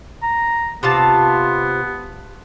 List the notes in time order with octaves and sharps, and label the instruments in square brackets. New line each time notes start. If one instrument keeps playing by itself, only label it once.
[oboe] A#5
[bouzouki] C3 F4 A5 [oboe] B3